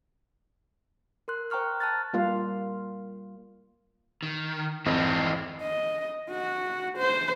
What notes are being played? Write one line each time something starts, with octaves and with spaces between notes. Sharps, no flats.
A#4 C6 F#6
C5 G5 A#5 C#6 F6 F#6
A5 A#5 F6 F#6 A6
G3 A#3 F4 F5
D#3
G#1 F2 E3 C4 D#5
D#5
F#4
C5